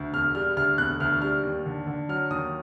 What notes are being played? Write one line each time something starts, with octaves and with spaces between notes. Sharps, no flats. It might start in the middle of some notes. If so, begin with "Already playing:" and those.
Already playing: D2
E1 F6
G3 F6
D2 F6
E1 F#6
D2 F6
G3 F6
D#2
D3
D3
F#3 F6
D#2 D#6